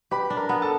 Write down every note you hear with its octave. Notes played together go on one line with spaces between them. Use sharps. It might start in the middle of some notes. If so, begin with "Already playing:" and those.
G4 B4 B5
D4
A#4 A#5
B3
A4 A5